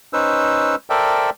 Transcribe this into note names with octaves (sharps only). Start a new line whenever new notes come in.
C#4 D#4 B4 C5 E6
A4 A#4 C5 D5 E5 G5